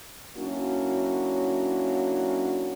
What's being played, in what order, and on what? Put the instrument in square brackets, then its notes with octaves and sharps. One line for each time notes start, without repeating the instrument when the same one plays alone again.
[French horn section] F#3 A#3 C#4 D4 E4 F#4